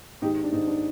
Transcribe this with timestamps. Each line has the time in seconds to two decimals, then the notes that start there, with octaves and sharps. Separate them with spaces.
0.22 G#2 D#3 G#3 D#4 G4
0.44 D4
0.52 G#2 D#3 G#3 D#4
0.67 D4